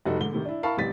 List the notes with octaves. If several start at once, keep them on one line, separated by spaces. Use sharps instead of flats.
F1 G3 D#4 F#4 A4
G#2 D3 G7
A2 C3 D#3
D4 E4
E4 A#4 F5 A5 B5 C#6
A1 C3 G3 A6 B6